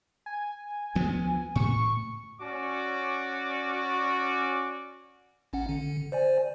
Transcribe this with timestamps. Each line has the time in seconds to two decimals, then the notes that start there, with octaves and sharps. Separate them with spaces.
0.26 G#5
0.95 D2 F3 B3
1.55 A2 C#6
2.40 C#4 F#4 D5 D6
5.53 A1 C#4 F#5
5.69 D3
6.12 C5 D5 G#5